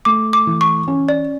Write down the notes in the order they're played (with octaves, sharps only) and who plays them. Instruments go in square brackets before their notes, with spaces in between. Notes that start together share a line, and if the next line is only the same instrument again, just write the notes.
[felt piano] A3 [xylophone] D6
[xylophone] D6
[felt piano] E3
[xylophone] C#6
[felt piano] C#4
[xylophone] D5